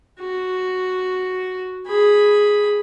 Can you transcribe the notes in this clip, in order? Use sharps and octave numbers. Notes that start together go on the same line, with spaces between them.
F#4
G#4 B5